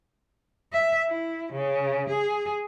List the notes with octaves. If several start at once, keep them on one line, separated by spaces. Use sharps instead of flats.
E5
E4
C#3
G#4